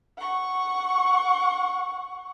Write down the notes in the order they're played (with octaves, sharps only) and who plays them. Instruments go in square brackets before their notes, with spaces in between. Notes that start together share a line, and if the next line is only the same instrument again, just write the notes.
[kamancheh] F#5 C#6